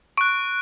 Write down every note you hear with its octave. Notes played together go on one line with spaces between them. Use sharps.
C#6 F#6 D7